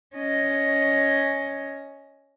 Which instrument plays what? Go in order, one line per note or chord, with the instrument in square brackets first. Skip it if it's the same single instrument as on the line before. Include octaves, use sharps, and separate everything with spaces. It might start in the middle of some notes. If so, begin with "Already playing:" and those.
[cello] C#4 D#5